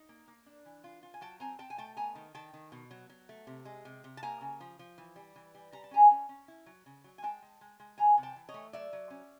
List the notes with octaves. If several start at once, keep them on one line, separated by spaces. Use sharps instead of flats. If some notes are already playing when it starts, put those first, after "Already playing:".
Already playing: D#4
A#3
A#3
D4
E3
F4
F4
G#5
F#3 G5 A5
C4 G#5 A#5
C4 G5 A5
G#5
A3 G5 A5
B3 G#5 A#5
D#3
D#3 G5 A5
D#3
B2
F#3
F#3
A3
C3
G#3
C3
C3
A5
A#3 G#5 A#5
C#3
F3
F3
E3
G3
E3
G3
G3 A#5
A5
C#4 G#5 A#5
C#4
C#4
E4
F#3
C#3
F#3
G#5
G#3 G5 A5
G#3
G#3
G#3
E3 G#5 A#5
C3
G5 A5
E3
C#5 D#5
A3
F#3 D5 E5
F#3
C#4